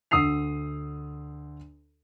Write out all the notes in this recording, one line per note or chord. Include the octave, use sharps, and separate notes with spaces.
D2 D#6 E6 C7 F7